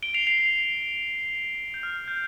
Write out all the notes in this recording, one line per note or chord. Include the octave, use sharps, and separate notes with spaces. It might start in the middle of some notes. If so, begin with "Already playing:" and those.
D7 G7
C7 F7
C7 F7
C7
G6
F6
G6